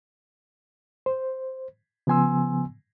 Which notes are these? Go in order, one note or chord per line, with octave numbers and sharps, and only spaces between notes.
C5
C#3 F3 B3 G#5 C6 E6